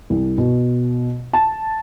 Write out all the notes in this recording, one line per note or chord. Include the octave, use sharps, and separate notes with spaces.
C2
B2
A5